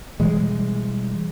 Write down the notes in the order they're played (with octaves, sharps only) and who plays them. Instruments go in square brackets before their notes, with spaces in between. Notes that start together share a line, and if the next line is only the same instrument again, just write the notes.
[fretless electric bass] B2 E3 G3 G#3